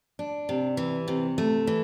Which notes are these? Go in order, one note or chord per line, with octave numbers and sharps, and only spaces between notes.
D4
C3
E3
C3
A3
E3